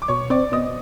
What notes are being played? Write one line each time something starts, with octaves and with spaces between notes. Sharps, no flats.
D6
B2 C#5 C#6
C4 D5 D6
B2 D#5 D#6